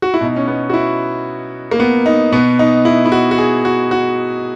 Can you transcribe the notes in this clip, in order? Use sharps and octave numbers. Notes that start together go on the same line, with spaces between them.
F#4
E4
B2 D#4
C#4
B3
F#4
E4
A#3
B3
D#4
B2 B3
D#4
E4
E4
F#4
F#4
G#4
F#4
F#4